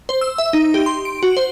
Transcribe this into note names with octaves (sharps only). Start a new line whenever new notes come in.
C5
E6
E5
D#4
G4
C6
D7
F#4
C5